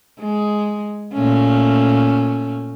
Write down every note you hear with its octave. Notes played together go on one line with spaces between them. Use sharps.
G#3
A#2 A3 C#4